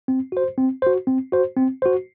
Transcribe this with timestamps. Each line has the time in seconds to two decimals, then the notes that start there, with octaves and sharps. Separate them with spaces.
0.08 C4
0.32 F#4 C5
0.58 C4
0.82 F#4 C5
1.07 C4
1.32 F#4 C5
1.57 C4
1.82 F#4 C5